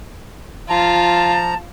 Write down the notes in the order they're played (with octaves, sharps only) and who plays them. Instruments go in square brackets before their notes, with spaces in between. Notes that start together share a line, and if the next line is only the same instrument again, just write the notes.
[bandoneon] F3 A#5 [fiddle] F4 [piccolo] A5